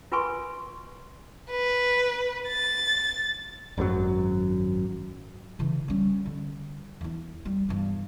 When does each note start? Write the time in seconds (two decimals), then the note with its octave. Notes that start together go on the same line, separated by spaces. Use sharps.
0.12 F4 A#4 B4 G#5 C6 C#6
1.51 B4
2.48 A6
3.78 G#1 F#2 B2 F#3
5.59 C#3 E3
5.88 G3 C#4
6.25 D3
7.01 E2 E4
7.45 G3
7.69 E2 G2